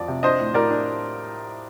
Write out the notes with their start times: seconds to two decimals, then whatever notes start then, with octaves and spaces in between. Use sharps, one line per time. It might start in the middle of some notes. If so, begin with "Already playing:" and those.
Already playing: F2 D5
0.08 C3
0.23 D4 C5 D#5
0.40 A2
0.54 A2 A#4 D5
0.71 D4